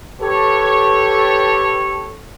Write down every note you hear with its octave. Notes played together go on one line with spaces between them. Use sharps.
G4 A4 B4 C#5